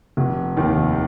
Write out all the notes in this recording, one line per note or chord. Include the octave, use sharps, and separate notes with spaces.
F1
D#2 D#3